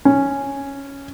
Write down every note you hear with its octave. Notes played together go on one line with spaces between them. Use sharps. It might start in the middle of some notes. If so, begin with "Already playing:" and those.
C#4